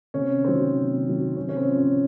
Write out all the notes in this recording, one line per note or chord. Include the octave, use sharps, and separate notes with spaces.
C3 C#4
D#3 F#3 C4
C3
D#3 F#3
C3 C#4
C#4
C4
F3
C#4